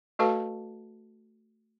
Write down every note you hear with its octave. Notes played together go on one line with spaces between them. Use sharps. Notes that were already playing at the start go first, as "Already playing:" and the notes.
A3 F#4 A4 B4 F5 A5